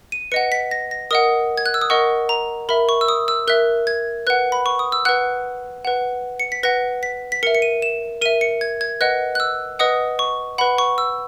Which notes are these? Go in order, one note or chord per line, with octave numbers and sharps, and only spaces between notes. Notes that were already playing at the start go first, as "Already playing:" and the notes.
D#7
B4 D#5 F#5 C#7
B6
A#6
A#6
A#4 D#5 F#5 D#6
G#6
F#6
E6
D#6
A#4 D#5 F#5 C#6
A#5
A#4 E5 B5
C#6
E6
D#6
E6
A#4 E5 F#6
G#6
B4 F#5 F#6
B5
C#6
D#6
E6
B4 F#5 F#6
B4 F#5
C#7
B6
B4 F#5 A#6
B6
B6
A#4 E5 C#7
C#7
D#7
E7
A#4 E5 D#7
C#7
G#6
G#6
B4 D#5 F#5 F#6
F#6
E6
B4 D#5 F#5 D#6
C#6
B4 F#5 B5
C#6
E6